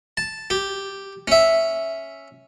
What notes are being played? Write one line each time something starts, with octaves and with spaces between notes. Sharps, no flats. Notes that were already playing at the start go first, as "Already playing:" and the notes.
A5
G4
C#4 E5